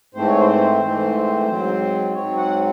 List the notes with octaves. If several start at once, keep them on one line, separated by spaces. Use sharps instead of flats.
G#2 E3 A3 C4 C5
C#5
C5
G#2 E3 A3 C4
G#2 F#3 C4
G#2 F#3 C4 C#5
F#5